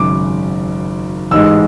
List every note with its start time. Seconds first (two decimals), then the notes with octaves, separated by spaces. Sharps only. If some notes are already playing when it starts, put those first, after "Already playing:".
Already playing: G#1 F#2 C#3 D6
1.31 A1 G#2 G#3 E6